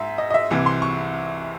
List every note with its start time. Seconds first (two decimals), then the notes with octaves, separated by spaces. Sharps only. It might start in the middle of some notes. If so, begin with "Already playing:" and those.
Already playing: G#2 E5
0.18 D#5
0.30 D#5
0.34 E5
0.51 C2 C3 E3
0.66 C6
0.82 C#6